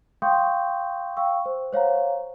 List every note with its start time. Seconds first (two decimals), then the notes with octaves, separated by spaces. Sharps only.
0.22 F5 G5 C6 C#6 D#6 G6
1.16 F5 G5 C#6 E6
1.46 C5
1.73 C5 C#5 F5 F#5 A#5